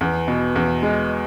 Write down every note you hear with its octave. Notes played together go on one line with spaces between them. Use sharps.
E2
B2
E2
G#3